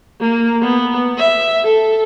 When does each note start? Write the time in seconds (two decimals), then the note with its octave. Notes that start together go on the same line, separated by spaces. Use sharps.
0.21 A#3
0.62 B3
1.18 E5
1.64 A4